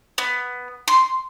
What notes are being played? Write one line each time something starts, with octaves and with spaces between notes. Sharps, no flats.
B3
C6